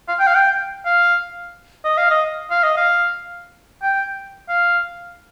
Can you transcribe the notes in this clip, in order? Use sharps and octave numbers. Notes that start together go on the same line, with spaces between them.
F5
G5
F5
G5
F5
D#5
F5
D#5
F5
D#5
F5
G5
F5